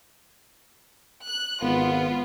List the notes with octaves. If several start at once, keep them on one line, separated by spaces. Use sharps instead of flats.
F#6
G#1 B3 F4